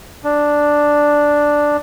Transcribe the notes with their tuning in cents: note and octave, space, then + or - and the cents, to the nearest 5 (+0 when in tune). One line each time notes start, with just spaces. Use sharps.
D4 +0